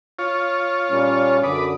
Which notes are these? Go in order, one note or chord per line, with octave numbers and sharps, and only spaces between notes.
F4 C#5
A#2 G3 A#3 C#4
F#2 D3 B4 D5 D#6